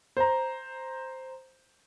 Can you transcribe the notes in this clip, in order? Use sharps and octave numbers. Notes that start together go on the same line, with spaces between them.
C5 A#5